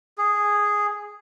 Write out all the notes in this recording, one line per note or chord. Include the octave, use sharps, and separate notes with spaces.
G#4